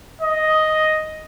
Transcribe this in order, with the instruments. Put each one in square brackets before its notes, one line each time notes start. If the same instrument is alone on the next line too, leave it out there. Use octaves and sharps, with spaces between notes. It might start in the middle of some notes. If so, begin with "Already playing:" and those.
[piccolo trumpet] D#5